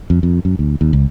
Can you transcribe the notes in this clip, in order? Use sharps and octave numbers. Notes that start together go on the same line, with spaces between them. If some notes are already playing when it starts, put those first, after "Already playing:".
F2
F2
F#2
D2
D#2
C#2